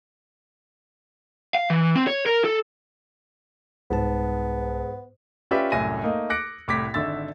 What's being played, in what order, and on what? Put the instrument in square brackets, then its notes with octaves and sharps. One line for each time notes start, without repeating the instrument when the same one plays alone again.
[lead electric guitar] F5
E3
C4
C#5
A#4
A4
[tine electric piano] C2 A5 [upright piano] G#2 [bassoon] B3
[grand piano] C#4 F4 G4 B4 D5 E5
C2 F#2 A2 G#5 A#6 D#7
A3 A#3 D#4
D6 F#6 A#6 C#7 D7
C2 A2 D6 G#6 A#6 B6
G#1 D3 E5 E6 A6